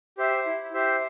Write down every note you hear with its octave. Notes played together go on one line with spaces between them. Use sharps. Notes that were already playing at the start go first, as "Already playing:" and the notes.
G4 C5 E5
E4
G4 C5 E5